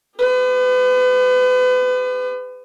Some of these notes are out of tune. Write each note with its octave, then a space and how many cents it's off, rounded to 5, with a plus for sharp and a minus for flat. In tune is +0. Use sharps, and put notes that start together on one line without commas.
G4 +45 B4 +35